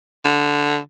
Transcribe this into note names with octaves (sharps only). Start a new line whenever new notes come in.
D3